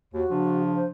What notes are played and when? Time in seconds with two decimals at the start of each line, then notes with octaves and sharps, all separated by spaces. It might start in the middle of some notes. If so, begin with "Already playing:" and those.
0.14 D#2 F#4
0.31 C#3 F3 D4
0.74 C5